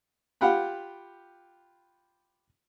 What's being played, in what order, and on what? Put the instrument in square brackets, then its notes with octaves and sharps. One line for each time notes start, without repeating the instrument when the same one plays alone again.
[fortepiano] F4 G4 F#5 G5 B5